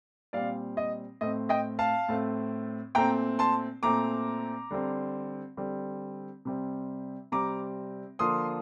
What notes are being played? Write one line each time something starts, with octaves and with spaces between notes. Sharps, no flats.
A#2 G3 C4 D5 F5
D#5
A2 A3 C4 D#5
D#5 G5
F5 A5
A2 A3 C4
A#2 A3 C4 G5 A#5
A5 C6
A#2 A3 C4 A#5 D6
D3 G3 C4
D3 G3 C4
C3 G3 C4
C3 G3 C4 A#5 D6
D3 F3 A#3 C6 D#6